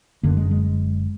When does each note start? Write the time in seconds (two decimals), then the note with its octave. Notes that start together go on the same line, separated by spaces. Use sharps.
0.23 F#1 F#2 D3 A#3
0.37 G#3
0.51 G#3